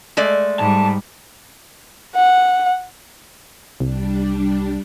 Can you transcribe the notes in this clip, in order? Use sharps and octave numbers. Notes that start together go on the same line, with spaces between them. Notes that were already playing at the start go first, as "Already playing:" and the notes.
G#3 A3 D5
G#2 G3 A5
F#5
C2 G3 D4